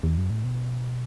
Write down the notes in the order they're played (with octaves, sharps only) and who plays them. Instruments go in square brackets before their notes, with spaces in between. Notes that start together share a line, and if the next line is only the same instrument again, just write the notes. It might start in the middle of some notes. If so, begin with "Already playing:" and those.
[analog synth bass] E2
F#2
A2
B2